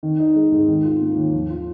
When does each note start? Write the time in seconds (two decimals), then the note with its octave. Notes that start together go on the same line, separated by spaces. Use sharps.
0.03 D#3
0.19 D#4
0.35 G#3
0.52 G#2
0.68 D#3
0.84 F4
1.01 A#3
1.17 D#2
1.34 F3
1.50 F4